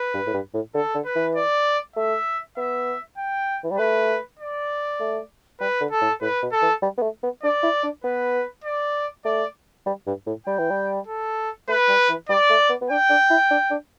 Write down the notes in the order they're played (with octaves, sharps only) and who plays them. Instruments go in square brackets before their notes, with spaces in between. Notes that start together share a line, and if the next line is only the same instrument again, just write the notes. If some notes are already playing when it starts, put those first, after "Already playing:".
Already playing: [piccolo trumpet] B4
[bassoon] G2
A2
G2
A2
[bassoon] D3 [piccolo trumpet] A4
[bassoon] D3
[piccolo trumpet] B4
[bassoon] E3
[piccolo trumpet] D5
[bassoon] A3 [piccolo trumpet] E5
[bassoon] B3 [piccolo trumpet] E5
[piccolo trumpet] G5
[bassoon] E3
G3
[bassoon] A3 [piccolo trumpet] B4
[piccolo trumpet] D5
[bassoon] A3
[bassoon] G3 [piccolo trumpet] B4
[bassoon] D3
[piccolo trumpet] A4
[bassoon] A2
[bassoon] A2 [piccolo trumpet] B4
[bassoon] B2
[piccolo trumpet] A4
[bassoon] E3
G3
B3
A3
B3
[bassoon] D4 [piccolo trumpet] D5
[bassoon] E4
D4
[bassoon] B3 [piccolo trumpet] B4
[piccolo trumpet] D5
[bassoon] A3 [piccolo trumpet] D5
[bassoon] G3
G2
A2
[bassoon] G3 [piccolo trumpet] G5
[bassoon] E3
G3
[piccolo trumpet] A4
[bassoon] A3 [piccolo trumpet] B4
[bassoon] G3
E3
[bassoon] G3 [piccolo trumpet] D5
[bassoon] A3
B3
B3
[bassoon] D4 [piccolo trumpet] G5
[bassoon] D4
E4
D4
D4